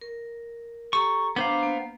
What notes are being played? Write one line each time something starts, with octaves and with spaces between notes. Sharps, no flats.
A#4
G4 A4 A#5 C#6
B3 D4 C5 F5 A#5 D6
A#3